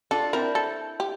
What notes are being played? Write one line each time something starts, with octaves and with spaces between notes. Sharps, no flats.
D4 F4 A4
C4 E4 A#4
A4
G4